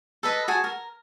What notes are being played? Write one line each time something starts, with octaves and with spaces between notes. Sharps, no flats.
A4 B4 D#5
F#4 G#4 G#5 A5
A#4